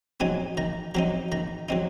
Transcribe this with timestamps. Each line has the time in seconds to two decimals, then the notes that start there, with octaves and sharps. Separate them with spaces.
0.20 F#3 C4 D#4 G#5
0.57 D#3 A#5
0.95 F#3 C4 D#4 A#5
1.32 D#3 A#5
1.69 F#3 C4 D#4